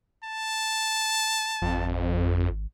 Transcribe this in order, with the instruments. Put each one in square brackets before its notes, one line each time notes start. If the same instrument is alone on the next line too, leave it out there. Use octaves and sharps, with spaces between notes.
[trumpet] A5
[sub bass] G#1 [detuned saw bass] F2